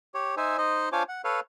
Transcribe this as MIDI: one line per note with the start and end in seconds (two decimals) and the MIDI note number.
0.14 0.35 67
0.14 0.35 73
0.37 0.57 63
0.37 0.57 72
0.37 0.57 76
0.37 0.57 80
0.58 0.89 63
0.58 0.89 72
0.58 0.89 75
0.92 1.03 62
0.92 1.03 65
0.92 1.03 72
0.92 1.03 73
0.92 1.03 80
0.92 1.03 86
1.09 1.22 78
1.24 1.40 69
1.24 1.40 71
1.24 1.40 73
1.24 1.40 77